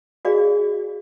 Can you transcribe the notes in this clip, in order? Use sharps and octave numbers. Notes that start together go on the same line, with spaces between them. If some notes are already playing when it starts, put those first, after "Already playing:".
F#4 G#4 D5 D#5 F5